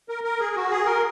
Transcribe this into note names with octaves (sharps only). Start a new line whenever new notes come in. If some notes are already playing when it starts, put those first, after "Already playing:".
A#4
A#4
G#4
F#4
G#4
A#4